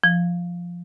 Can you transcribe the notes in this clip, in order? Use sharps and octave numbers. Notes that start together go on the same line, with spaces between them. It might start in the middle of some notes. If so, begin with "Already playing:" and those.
F3